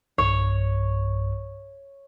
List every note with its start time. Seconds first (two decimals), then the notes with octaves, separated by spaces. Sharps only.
0.18 B1 G2 C#5